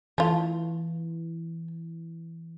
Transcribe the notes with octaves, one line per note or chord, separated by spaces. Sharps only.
E3 A3 F4